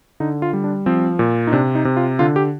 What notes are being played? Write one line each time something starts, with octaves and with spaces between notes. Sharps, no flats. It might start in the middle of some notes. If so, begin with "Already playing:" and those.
D3 D#4
F4
G3
D4
F3 C4
A#2
D#4
C3 D4
D#4
C3
F4
D3 F4
G4